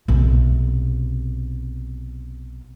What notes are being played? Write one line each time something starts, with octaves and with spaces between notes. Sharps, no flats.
B1 C3